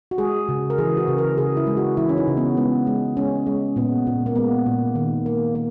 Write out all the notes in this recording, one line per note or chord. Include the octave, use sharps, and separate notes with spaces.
F#4
G#3 G#4
C#3
A#4
E3 G#4
F#4
C#3
A#4
C#3 G#4
E4
G#3
F#4
E3 E4
C#4
D#4
C#3
B3
G#3 B3
G#3
G#3 C#4
G#3
A#2 B3
A#2
A#3
G#3 B3
A#2
D#3
A#3
A#3